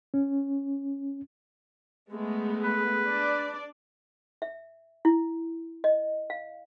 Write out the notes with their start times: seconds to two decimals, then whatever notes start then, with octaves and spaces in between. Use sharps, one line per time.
0.14 C#4
2.11 G#3 A3 B3
2.64 B4
3.06 D4 D5
4.42 E5
5.05 E4
5.84 D#5
6.30 F5